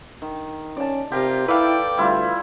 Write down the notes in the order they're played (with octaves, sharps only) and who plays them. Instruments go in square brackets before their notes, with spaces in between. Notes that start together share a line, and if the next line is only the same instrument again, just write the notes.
[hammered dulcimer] D#3
[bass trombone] C#4 [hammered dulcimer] D5 A5
[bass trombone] C3 [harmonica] F4 [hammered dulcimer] G4 A#4
[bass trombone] E4 [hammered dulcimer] A4 [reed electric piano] B4 F5 [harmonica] D5 G5 D6
[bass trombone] D2 [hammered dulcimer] G3 E4 F4